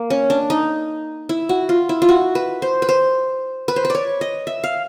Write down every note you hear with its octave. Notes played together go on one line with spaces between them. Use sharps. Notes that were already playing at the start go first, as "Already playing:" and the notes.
Already playing: A#3
C#4
D4
D#4
E4
F#4
F4
E4
F4
F#4
B4
C5
B4
C5
B4
C5
B4
C#5 D5
D#5
E5
F5